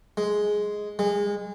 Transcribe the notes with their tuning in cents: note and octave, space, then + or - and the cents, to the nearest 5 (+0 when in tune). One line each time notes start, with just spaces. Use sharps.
G#3 +5
G#3 -25